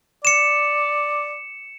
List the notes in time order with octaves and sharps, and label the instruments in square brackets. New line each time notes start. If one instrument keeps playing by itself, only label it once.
[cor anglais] D5 [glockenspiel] C#7 E7